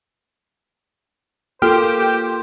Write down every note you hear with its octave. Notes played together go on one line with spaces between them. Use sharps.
A#3 F4 G4 A4 C5 F6